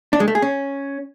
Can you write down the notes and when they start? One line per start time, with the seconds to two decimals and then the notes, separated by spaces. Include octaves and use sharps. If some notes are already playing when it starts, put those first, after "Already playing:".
0.13 D4
0.20 G#3
0.28 A3
0.35 G#4
0.42 C#4